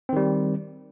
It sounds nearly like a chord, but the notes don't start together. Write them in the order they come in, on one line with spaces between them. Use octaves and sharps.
C4 D#3 G3